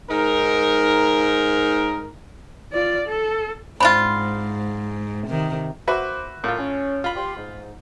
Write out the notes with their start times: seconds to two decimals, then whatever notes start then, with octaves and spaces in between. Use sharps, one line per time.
0.10 G#2 D#4 A#4
2.73 F4 D5
3.08 A4
3.80 G#2 C4 D4 F4 B5
5.27 C3 D#3
5.88 A#3 F#4 B4 C5 E5 D6
6.44 A2 A#3 F4
6.59 C#4
7.04 F4 B5
7.16 G4 C6
7.36 G#2